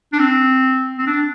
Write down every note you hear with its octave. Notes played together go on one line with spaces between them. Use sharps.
D4
C4
C4
D4